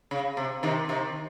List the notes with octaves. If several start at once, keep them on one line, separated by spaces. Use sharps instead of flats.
C#3
C3
C3 D#3
C3 D#3